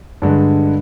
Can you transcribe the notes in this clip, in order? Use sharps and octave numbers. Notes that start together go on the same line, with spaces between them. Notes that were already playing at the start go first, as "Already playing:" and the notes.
G2 D3 G#3